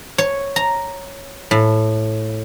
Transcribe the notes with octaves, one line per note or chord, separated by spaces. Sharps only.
C#5
A#5
A2